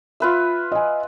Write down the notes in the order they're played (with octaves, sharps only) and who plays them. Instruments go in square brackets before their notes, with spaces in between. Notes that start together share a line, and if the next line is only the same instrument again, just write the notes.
[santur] F4 B4 E5
[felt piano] D#5 G#5